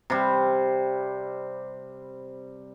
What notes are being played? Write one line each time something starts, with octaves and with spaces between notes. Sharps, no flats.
C3 G3